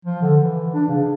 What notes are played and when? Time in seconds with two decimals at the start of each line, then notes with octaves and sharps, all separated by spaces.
0.05 F3
0.22 D3
0.39 E3
0.74 D4
0.89 C#3